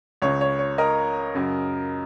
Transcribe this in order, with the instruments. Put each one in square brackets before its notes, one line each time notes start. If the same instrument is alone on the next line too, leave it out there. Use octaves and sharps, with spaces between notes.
[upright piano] C#2 C#3 C#5
C#5
C#5
A#4 D#5
F#2 C#3